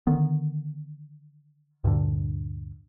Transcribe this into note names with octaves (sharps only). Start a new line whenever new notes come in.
D3 D#3 B3
D2 G2 A#2 D3